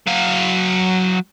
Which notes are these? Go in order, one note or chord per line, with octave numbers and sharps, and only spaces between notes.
F#3 F5